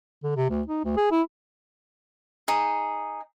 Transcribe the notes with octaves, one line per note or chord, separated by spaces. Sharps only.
D3
C3
D2
D#4
D2
G#4
E4
D#4 G#4